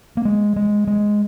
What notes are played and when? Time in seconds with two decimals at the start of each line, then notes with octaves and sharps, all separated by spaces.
0.17 A#3
0.25 G#3
0.56 G#3
0.87 G#3